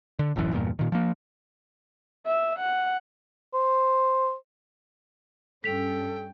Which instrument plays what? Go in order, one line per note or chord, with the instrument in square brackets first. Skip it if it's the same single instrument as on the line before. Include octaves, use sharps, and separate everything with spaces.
[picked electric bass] D3
E1 A1 F#2 E3
E2 G2 A#2
A#2 D#3
F3 A#3
[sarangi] E5
F#5
[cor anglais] C5
[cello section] G2 C#4 [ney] A4 [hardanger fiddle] G5 [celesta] B6 F7